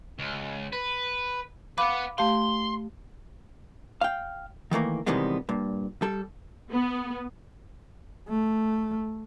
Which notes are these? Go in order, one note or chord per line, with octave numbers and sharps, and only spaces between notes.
C#2
B4
B4 F5 F#5 B5 D6
A3 G4 F5 C6
F5 G5
D#3 E3 A3 A#3
C3 D#3 E3 G3 G#3 B3
G2 A#2
G3 A4
B3
A3